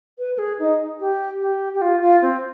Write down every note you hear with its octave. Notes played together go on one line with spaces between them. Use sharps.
B4
B4
G#4
D#4
G4
G4
G4
F4
F4
C4